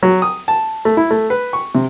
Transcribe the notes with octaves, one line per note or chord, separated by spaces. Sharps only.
F#3
D#6
A5
A3
E4
A3
B4
C#6
C3